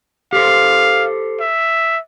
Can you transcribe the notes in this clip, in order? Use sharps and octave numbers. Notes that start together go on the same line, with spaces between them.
G4 A4 C5 F5
E5